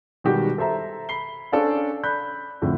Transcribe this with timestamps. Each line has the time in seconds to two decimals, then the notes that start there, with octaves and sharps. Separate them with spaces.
0.24 B2 D#3 G3 G#3 F#4 G4
0.58 A4 C5 E5 A#5
1.09 B5 C7 G7
1.52 C#4 D4 A4 C5 D5 F5
2.04 D5 B5 F#6 G6
2.62 F2 A2 D3